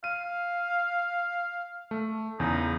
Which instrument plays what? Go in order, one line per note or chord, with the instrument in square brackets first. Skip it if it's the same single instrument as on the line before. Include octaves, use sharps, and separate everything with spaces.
[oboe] F5 [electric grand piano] D#7
[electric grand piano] A3
[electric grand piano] E2 C#3 [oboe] D#4